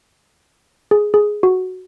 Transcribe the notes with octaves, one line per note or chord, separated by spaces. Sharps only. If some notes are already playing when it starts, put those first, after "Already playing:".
G#4
G#4
F#4